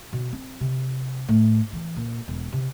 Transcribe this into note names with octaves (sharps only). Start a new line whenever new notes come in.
B2
C4
C3
A2
E3
A#2
E1
C3